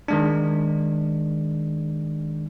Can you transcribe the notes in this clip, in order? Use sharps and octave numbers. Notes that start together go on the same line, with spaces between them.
D#3 G#3 D4